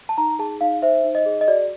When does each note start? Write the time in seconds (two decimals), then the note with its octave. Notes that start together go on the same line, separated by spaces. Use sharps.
0.09 A5
0.18 D#4 A#5
0.39 G#4 A5
0.61 D#4 F5
0.82 C5 E5
1.04 D#4
1.15 D#5
1.26 G#4
1.41 D#5
1.48 F#4 D5